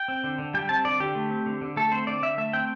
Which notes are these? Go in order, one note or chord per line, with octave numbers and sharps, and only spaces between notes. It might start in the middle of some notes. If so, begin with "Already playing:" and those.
Already playing: G5
C4
D3
D3
G3 G5
C4 A5
D3 D5
D3 G4
A3
C4
D3
D3
A3 A4
C4 C5
D3 D5
D3 E5
A3 E5
C4 G5